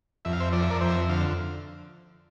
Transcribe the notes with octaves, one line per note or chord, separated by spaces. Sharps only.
F2 E5
F5
C5 E5
F3 D5
E5
A#4 D5
F2 C5 E5
D3 F5